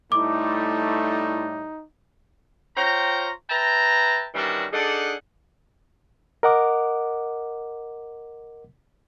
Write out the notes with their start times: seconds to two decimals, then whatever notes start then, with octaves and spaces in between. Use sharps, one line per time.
0.12 A2 G3 A3 D#4 E4 D6
2.77 F4 C5 C#5 G5 A#5
3.50 B4 E5 G5 A5 A#5
4.34 D#3 E3 G3 C#4 D4 F#4
4.73 D4 D#4 G#4 A4 D5 F#5
6.43 A#4 D#5 F#5 D6